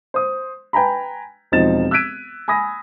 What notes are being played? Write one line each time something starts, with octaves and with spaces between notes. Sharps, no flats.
C5 D#6
B4 G5 G#5 A#5 B5
E1 F3 C4 D#4 A6 E7
E6 F#6 G#6 B6 D7 D#7
G#5 B5 D#6 A#6